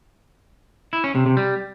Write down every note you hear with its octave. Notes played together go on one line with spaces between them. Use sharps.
E4
C#4
C3
C3
G3